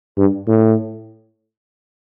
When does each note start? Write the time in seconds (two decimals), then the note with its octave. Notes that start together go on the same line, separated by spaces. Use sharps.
0.17 G2
0.47 A2